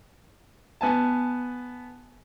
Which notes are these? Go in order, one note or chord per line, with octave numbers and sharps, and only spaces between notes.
B3 G#5 A5